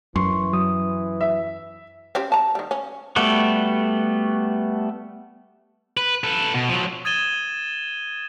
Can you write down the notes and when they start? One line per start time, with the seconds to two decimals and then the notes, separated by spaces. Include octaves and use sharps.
0.16 F#2 E3 C6 C#6
0.53 F#3 D#6
1.21 E5
2.15 C4 C#4 G4
2.32 A5 A#5
2.55 D#3 G3
2.71 C#4
3.16 G3 A3 B3 F#4
5.97 B4
6.24 A4 B4
6.54 B2
6.69 F3 F#3
7.05 D#6 G#6 A6 D#7 E7 G7